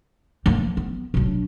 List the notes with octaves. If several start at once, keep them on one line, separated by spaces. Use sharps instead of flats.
F3 A#3
B3
B1 D4